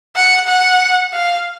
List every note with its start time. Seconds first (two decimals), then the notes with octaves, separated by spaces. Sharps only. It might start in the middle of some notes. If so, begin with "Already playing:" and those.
0.16 F#5
0.47 F#5
1.13 F5